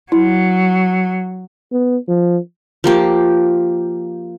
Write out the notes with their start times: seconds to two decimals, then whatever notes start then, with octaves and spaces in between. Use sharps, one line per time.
0.12 F#3 E4
1.72 B3
2.08 F3
2.84 F3 A#3 G4